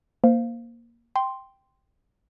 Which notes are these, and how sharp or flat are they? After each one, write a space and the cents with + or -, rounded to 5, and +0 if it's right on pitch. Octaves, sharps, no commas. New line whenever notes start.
A#3 +5 C5 -15 F5 +0
G5 +0 C6 +0